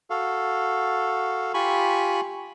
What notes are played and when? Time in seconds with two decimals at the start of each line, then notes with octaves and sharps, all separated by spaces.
0.10 F#4 A4 F5
1.54 F4 G4 G#5 B5 C#6